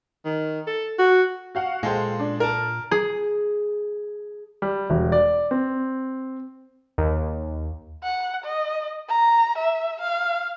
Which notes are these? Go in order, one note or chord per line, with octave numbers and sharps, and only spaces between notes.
D#3
A4
F#4
F#4 F5 F#5
A#2 G#3 A4 C5 F5 G5
D4
A#4 A5
G#4
G3
E1
D5
C4
D#2
F#5
D#5
A#5
E5
F5